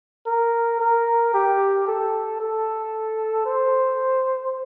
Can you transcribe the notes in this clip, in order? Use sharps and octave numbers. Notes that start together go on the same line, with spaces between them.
A#4
A#4
G4
A4
A4
C5